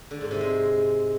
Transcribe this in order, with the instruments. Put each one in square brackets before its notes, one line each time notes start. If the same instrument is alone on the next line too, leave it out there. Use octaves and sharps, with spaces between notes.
[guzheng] D3
G#2
C3
G#3